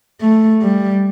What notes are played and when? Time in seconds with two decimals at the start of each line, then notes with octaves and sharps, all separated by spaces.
0.21 A3
0.62 G3